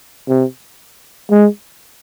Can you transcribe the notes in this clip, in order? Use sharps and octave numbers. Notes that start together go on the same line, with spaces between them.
C3
G#3